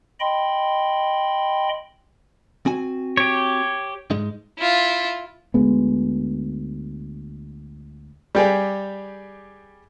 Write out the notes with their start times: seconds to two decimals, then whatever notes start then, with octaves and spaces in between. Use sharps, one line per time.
0.20 D#5 G5 B5 C6
2.66 C4 F#4 G#5
3.17 G4 C#5
4.11 G#2 G#3 D#4
4.58 E4 F4
5.54 D2 G#3 B3
8.35 G3 G4 G#4